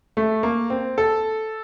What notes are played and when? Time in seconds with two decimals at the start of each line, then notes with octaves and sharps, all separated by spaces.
0.17 A3
0.43 A#3
0.70 C4
0.98 A4